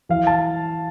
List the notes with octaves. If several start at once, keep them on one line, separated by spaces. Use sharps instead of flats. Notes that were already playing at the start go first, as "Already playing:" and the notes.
E3 F5
A5